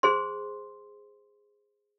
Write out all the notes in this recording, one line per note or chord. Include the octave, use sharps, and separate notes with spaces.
G#4 C5 C6